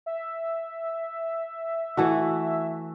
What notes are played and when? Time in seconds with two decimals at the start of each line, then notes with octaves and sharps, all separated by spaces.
0.06 E5
1.97 E3 A3 F#4